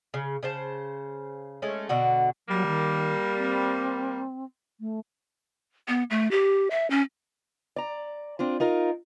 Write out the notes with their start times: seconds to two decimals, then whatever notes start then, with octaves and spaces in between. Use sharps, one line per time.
0.14 C#3
0.43 C#3 C5 A5
1.62 G#3 A3 C#4
1.89 B2 D3 F#4
2.48 F#3 G3 A#3
2.66 D#3
3.37 C4
4.80 A3
5.88 B3
6.10 A3
6.31 G4
6.71 E5
6.90 C#4
7.76 D5 A#5
8.39 C4 D4 F4
8.60 D#4 F4 A#4